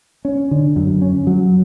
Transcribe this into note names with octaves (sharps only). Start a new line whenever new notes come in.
C#4
D3
F#2
C#4
F#3